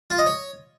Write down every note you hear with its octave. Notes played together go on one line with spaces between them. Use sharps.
F4
D#5
C#5